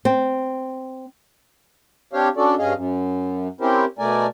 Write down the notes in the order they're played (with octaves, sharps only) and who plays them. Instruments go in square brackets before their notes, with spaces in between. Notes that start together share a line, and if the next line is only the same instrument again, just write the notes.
[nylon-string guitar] C4
[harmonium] C4 D4 G4 C#5 F5
C#4 D4 F#4 A4 D5
G2 C#4 G#4 D#5 F5
F#2
C4 C#4 E4 G4 A#4 C5
B2 A3 A#4 D5 G#5